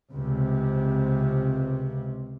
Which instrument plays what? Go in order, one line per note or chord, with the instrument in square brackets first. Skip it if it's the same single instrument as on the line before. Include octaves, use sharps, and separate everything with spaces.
[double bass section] C#2 C3